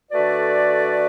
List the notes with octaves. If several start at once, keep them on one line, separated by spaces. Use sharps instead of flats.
D3 A3 F#4 B4 D5